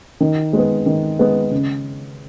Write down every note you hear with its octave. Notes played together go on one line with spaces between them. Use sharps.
D#3
G#3 B3
D#3
G#3 B3
C#3